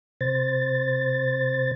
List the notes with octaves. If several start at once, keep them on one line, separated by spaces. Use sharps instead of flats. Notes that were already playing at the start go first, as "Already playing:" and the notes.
C3 C5 A6